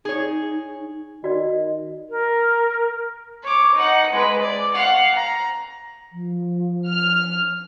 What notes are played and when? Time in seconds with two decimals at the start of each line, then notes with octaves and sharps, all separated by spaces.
0.05 D#4 G#4 C#5
1.24 D#3 F#4 D5 D#5
2.10 A#4
3.42 C#5 D6
3.74 D#4 F#5
4.12 G#3 B4
4.41 D5
4.74 F5 F#5
5.16 A#5
6.12 F3
6.88 F6